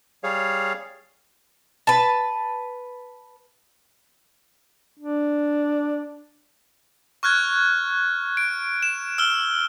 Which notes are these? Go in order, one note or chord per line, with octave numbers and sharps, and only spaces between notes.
G3 G#4 C#5 F5
B4 A5
D4
C#6 F6 F#6 G#6
D7
E7
E6 F6 G7